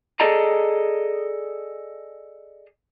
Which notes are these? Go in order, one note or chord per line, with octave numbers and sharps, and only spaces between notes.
G#4 A4 D5 D#5 A5 A#5